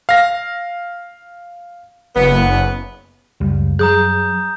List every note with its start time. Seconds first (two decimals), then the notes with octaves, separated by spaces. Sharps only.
0.09 F5 A#6
2.16 F#1 B3
3.40 C#2 F#2 G3
3.79 F#3 G#4 A#5 D#6 G6